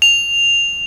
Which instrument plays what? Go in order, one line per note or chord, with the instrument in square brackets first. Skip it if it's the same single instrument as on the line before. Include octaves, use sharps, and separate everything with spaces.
[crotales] F7